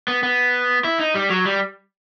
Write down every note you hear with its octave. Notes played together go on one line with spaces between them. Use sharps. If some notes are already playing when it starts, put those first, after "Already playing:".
B3
B3
E4
D#4
G3
F#3
G3